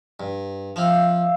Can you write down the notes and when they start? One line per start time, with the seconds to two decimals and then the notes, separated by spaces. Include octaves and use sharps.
0.20 G2
0.76 F3 C4 E5 F5 E6